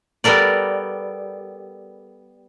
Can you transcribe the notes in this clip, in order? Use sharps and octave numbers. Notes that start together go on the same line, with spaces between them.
G3 B3 A4 A#4 D5